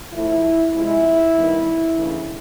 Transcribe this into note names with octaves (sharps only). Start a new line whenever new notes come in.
A2 F3 A3 E4
C3 F3 G#3 E4
G2 D#3 G3 B3 D#4
C#3 E3 A3 D4